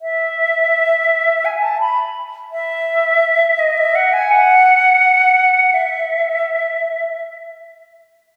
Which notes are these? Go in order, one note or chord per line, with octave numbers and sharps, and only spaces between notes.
E5
G#5
A5
B5
E5
D#5
E5
F#5
G#5
F#5
E5